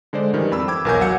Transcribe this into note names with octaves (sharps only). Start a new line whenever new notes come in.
D3 G#3 C5 D5
D#3 E3 G3
F2 B5 E6
G5 D6 G#6
B1 E2 A#4 C#5 G#5 G6
F#3 F#5 C#7